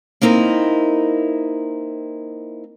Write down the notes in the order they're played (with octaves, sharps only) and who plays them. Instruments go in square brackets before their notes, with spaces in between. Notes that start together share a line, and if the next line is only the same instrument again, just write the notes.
[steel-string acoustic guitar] A#3 C4 D#4 E4 A#4